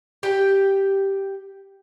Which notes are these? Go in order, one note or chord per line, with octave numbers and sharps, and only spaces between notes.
G4 G5